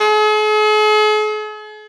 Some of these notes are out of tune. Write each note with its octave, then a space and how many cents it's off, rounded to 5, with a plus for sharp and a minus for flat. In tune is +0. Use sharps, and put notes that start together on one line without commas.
G#4 +45